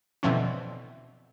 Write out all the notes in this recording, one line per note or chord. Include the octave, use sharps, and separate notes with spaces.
B2 D3 E3 F3 C4 C#4